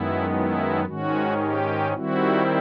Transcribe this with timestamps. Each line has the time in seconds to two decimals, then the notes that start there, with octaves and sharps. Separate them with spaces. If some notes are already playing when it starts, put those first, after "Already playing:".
Already playing: F#2 D#3 G#3 B3 E4
0.31 E4
0.85 G#2 D#3 G#3 C#4 F#4
1.39 G4
1.93 D#3 G3 C4 E4 F#4